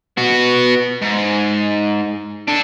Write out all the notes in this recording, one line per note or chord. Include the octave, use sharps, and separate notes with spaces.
B3 F#4
G#2
D4 A4